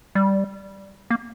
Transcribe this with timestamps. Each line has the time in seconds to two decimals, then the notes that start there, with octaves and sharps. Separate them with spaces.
0.15 G3
1.10 A#3